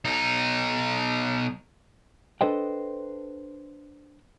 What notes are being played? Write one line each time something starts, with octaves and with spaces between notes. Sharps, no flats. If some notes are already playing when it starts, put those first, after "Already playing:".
B1 D#4
D4 A4 B4 C5 D#5 G5